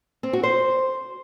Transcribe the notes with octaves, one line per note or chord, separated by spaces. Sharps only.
C4
F#4
C5